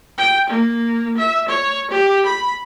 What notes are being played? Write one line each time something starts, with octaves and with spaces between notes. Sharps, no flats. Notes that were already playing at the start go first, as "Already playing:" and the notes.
G5
A#3
E5
C#5
G4
B5